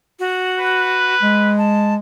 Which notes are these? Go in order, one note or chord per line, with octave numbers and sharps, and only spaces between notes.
F#4
B4
G#3
A5